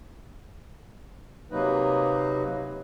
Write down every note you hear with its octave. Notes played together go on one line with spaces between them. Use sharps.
C3 F#3 A#3 D#4 B4